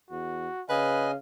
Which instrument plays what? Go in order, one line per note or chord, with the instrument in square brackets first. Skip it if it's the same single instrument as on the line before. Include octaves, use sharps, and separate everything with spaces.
[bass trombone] E2 [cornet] F#4
[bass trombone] C#3 [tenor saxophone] B4 [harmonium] D#5 G#5 [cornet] F5